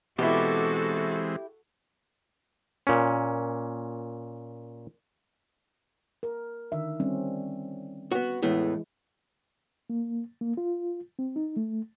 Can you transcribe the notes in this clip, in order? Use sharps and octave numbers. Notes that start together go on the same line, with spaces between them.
B2 E3 G#3 C4 E4 F#4 G4 A4
A#2 C#4
A#4
D3 D#3 E5
G3 C4 C#4
B3 F#4
E2 A2 E3 G#3 B3 E4
A#3
A#3
F4
C4
D#4
A3